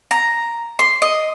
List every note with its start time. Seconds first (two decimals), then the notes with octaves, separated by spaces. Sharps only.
0.11 A#5
0.79 C6
1.02 D#5